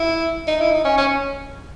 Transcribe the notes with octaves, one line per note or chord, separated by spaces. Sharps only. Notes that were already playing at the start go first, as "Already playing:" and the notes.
Already playing: E4
D#4
E4
D#4
C#4
C#4